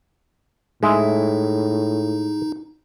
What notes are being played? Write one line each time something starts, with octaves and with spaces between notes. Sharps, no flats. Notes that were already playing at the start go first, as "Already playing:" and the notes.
A2 G#3 D#4 E4